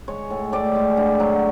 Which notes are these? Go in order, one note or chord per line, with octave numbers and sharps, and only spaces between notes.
G#3 C#5
A2
A2 D5
G#3
D3
F#3